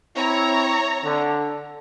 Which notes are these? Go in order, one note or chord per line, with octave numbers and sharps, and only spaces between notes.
C4 E4 C#5 A#5
D3